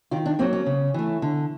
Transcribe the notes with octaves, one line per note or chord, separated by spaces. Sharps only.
D#3 F4
D4
F#3 A#3 C4
C#4
C#3
E3 A3
D3